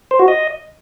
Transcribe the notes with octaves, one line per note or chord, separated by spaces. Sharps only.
C5
F#4
D#5